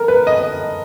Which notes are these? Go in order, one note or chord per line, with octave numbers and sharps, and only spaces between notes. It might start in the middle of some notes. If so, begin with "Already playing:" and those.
Already playing: A4 A#4
B4
D#5